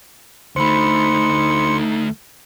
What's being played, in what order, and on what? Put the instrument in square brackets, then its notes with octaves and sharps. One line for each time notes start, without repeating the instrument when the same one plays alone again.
[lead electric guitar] D2 A3 [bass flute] D#4 [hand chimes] C5 B5 [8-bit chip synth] C6 C#7